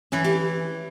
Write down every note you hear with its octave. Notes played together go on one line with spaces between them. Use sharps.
E3 C#4 E4
E4 G4